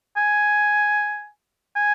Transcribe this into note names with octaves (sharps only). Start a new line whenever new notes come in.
G#5
G#5